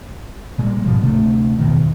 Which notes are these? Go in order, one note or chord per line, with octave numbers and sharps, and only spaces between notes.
A#2 G3 G#3
G#2 B2 F3
D2 C3 A3
E2 B2 D#3